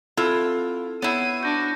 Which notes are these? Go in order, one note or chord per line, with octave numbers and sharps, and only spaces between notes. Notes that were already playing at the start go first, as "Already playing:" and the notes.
C4 E4 F4 A4 E6
B3 E4 C#5 C7 D#7
D4 F#4 G6 A#6